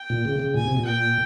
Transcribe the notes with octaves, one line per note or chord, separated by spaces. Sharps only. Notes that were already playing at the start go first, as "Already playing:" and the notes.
Already playing: G5
A#2
C#3
C#3
A#2 G#5
C3
A#2
G5